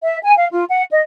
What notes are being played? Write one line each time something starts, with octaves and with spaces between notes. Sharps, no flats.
E5
G#5
F5
F4
F#5
D#5